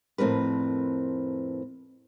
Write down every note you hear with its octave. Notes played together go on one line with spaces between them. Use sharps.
F2 A2 C4 A#4 B4